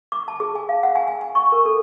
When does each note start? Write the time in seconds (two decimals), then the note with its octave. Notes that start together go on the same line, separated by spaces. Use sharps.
0.12 D6
0.28 A5
0.40 G#4
0.55 G#5
0.69 F5
0.83 F#5
0.95 G#5
1.07 G#5
1.21 G#5
1.35 C#6
1.52 A#4
1.65 A4